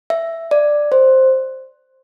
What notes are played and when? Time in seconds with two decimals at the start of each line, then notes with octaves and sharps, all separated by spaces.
0.10 E5
0.51 D5
0.92 C5